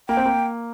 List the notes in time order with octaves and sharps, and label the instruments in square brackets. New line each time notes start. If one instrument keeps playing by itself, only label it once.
[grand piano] A#3 [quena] G5
[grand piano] C4
A#3